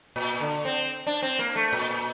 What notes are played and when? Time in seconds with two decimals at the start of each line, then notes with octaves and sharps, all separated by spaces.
0.16 A#2
0.40 D3
0.65 C4
1.07 D4
1.23 C4
1.39 A#3
1.56 A3
1.73 A#2